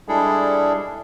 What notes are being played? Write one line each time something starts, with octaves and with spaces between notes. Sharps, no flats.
G3 G#3 D4 E4 G#4 A4